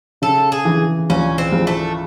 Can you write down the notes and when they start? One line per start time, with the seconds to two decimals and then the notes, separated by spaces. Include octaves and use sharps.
0.22 C#3 A4
0.52 G#4
0.65 E3
1.10 C#2 C#4
1.38 C4
1.52 C#2
1.67 A3